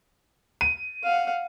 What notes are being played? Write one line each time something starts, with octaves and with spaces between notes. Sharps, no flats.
D#7
F5 F#5